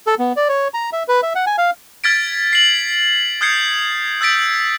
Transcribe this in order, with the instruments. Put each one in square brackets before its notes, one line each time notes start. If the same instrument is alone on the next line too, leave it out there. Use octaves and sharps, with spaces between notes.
[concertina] A4
B3
D5
C#5
A#5
E5
B4
E5
F#5
G#5
F5
[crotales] F6 G#6 A6 B6 D7
C7 F#7
D#6 F6 G6 G#6 C7 C#7
E6 G6 A6 B6 D7